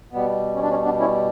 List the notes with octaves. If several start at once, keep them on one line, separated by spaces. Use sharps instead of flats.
B2 G3 B3
C#4
D4
C#4
B3 D4
C#4 E4